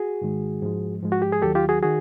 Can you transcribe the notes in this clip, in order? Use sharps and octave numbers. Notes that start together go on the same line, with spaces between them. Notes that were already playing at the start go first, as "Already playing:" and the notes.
Already playing: F#4 G#4
G#2 D#3 G#3
G#2 F3 G#3
G#2 F3 G#3
F#4
G4
G#4
D#2 D#3 F#3 G4 A4
F4 G4
F#4 G#4
D#3 F#4 G#4